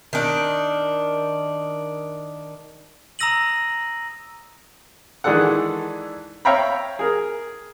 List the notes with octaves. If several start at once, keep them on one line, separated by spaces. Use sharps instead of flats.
D#3 D4
A#5 D#6 E6 A#6 D#7 F#7
D#3 E3 G#3 D4 A4 F#5
C#5 E5 F5 G5 A#5 B5
G#4 A#4